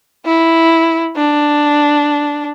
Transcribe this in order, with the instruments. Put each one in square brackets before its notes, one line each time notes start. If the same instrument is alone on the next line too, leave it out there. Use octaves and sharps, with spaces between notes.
[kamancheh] E4
D4